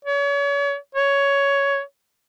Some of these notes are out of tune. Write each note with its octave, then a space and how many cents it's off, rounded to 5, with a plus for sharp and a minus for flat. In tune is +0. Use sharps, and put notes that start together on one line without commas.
C#5 +35
C#5 +10